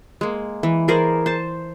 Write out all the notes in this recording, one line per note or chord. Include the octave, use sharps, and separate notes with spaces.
G#3 A#3
E3
G#4 A#4 C5 D5
C5 A5